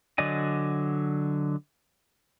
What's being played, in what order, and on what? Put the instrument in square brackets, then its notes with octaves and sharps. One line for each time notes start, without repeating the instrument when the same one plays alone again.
[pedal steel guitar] D3 F#3 D5 D#5 G#5